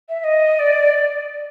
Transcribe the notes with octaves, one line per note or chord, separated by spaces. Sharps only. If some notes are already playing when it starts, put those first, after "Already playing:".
E5
E5
D#5
D5